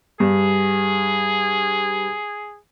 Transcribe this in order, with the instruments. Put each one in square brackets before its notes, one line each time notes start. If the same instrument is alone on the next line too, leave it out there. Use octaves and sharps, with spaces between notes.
[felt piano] G2 [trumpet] G#4